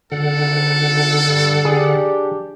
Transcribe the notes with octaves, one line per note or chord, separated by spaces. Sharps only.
G#1 D3 A4 F#5
G2
D4 G4 G#4